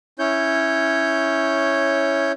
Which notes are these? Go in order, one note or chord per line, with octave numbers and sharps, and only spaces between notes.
C#4 E4 C#5 G6